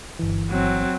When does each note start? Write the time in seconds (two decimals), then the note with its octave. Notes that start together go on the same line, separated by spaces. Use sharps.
0.19 G1 E3
0.50 F#3 C4